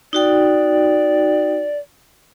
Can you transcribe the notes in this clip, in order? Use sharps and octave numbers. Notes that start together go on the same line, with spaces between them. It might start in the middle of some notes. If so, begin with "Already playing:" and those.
D#4 F#4 D5 G5